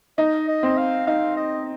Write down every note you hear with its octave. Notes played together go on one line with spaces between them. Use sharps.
D#4 D#5
D#5
C4
F5
D#4 F5
D#5